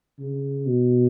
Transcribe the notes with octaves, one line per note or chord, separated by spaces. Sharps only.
C#3
B2